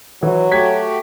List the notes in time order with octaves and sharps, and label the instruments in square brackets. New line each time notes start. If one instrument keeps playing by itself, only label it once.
[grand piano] E3 [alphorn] F#3
[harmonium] A3 F#4 G4 [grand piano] G#6 B6